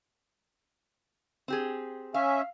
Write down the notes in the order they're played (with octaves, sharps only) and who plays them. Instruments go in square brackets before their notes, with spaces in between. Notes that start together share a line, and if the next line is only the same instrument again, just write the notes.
[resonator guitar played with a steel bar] C4 G4 G#4
[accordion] C#4 E5 [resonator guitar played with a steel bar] F5